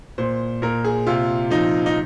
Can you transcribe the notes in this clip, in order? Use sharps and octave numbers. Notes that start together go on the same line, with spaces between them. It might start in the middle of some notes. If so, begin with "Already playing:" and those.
A#2 C5
A#2 A#4
G#4
C3 F4
F3 D#4
D#4